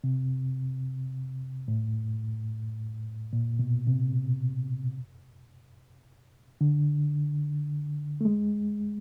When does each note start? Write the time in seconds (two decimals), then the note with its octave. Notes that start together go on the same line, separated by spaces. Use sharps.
0.04 C3
1.68 A2
3.33 A#2
3.59 B2
3.87 C3
6.61 D3
8.21 A3
8.25 G#3